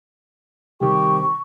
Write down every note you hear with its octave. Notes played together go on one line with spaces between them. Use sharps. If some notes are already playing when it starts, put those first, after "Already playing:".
C3 D#3 G3 G4 C#6